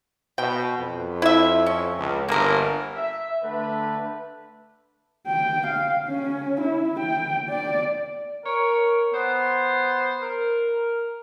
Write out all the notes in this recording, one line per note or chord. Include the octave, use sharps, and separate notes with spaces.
B2 G5
F2
E4 E5
C#4
C#2
G1 A#3 A#4
E5
D3 A3 B4
G5
F5
C#4
E4
G5
D5
A#4 C#5
B3 C5
A#4